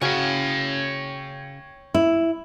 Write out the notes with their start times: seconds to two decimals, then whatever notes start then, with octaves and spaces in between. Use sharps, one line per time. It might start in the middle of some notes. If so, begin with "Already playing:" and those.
0.02 C#3 C#4 F#4 C#5 G5
1.94 E4